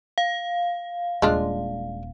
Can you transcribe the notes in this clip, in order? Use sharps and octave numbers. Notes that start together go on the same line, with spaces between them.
F5
D#1 G#3 D4 F4